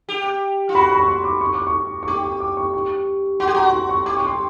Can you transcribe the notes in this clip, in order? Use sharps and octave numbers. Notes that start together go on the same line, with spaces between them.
G4
F4
F#4 B5
B5
C#6
C6
D6
C#6
D6
C#6
C#6
G4 D6
C#6
D6
C#6
C#6
F#4 C6
G4
F#4 A#5
C#6
C6
C#6
G4 D6
C#6
C6